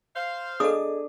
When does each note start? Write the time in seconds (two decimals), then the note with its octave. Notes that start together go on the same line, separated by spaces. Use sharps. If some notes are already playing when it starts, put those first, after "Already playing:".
0.16 C5 F5
0.60 D4 G#4 A4 D#5 D#6